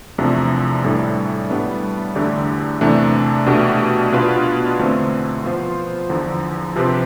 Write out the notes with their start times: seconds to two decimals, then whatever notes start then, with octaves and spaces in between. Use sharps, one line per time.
0.18 E2 C3 F3 A3 D4
0.84 A2 E3 G3 D4 A4
1.50 A2 G3 B3 D4
2.15 E2 D3 A3 D4 G4
2.81 E2 C3 E3 A3 D4
3.46 B2 A3 D4 G4
4.12 B2 B3 D4 F4 B4
4.79 E2 D3 A3 C4
5.43 F3 B3 F4 C5
6.10 E2 D3 F3
6.76 C3 F3 C4 G4 B4